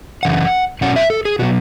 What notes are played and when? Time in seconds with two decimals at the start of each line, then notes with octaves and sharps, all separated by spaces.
0.23 F#2 C#3 E3 F#5
0.81 B2 F#3 C#4 F#5
0.96 E5
1.10 A4
1.25 G#4
1.39 B2 F#3 B3 F#4